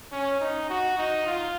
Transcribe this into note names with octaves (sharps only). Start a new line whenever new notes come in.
C#4
D#4
F#4
D#4
F4